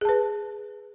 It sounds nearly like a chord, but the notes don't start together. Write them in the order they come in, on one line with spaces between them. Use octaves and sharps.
G#4 A5 B4